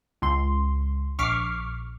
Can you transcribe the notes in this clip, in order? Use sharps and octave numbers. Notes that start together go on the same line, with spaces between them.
C#2 C6
A#1 C#6 D6 F6 B6 C7